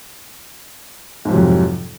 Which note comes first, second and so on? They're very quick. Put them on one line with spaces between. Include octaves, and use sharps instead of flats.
G#2 F3 C3 F#3 F2